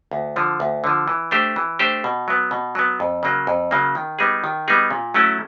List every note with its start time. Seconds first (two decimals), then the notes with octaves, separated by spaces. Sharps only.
0.11 D2
0.36 D3 F3
0.60 D2
0.84 D3 F3
1.08 E3
1.31 A3 D4 G4 C5
1.56 E3
1.79 A3 D4 G4 C5
2.04 B2
2.28 F#3 B3
2.51 B2
2.75 F#3 B3
3.00 F2
3.23 C#3 F#3 A#3
3.47 F2
3.71 C#3 F#3 A#3
3.95 D#3
4.19 G3 B3 D#4 G#4
4.44 D#3
4.68 G3 B3 D#4 G#4
4.90 A#2
5.14 F#3 A3 C#4 E4